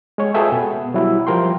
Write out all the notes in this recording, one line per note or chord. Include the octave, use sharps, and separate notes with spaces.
G#3 C#5
F4 G#4 A4 B4 E5 G5
B2 B3
F#3 G3 E4
F3 G3 A#4 G5 C6